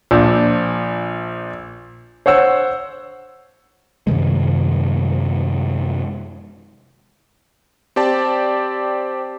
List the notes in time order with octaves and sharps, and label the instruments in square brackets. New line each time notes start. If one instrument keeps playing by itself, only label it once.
[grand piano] A#1 F3 D4
C5 C#5 F#5 E6
[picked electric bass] F#2 C3 D#3 G#3
[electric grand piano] C4 G4 D5 A5